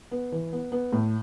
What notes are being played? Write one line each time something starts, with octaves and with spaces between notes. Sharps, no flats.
B3
E3
B3
B3
A2